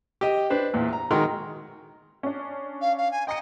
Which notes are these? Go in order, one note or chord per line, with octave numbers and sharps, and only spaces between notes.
G4 D#5
D4 B4 C5
E2 A#2
A#5
D#3 G#3 F#4 A#4 A#5 C6
C#4 D4
F5
F5
G#5
D#5 G5 A#5 C#7